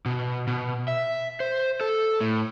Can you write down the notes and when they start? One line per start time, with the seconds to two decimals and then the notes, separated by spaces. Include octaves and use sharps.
0.06 B2
0.47 B2
0.88 E5
1.40 C5
1.81 A4
2.21 A2